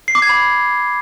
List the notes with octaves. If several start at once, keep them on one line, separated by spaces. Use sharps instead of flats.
C7
D6
G#6
B5